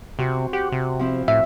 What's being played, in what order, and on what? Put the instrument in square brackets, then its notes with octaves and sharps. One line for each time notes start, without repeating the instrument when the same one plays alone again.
[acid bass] C3 [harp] C4 F#4
[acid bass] G4 [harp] F#5
[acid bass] C3
[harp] F3 C4 E4
[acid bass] A2 [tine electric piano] E5